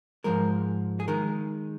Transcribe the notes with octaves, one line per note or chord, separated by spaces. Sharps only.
G#2 F3 G#3 A#4
G#4
D#3 G#3 A#4